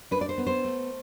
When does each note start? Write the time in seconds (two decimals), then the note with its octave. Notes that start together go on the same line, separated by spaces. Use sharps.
0.11 D4 B4
0.21 D5
0.29 C5
0.38 B3
0.47 C5
0.65 A3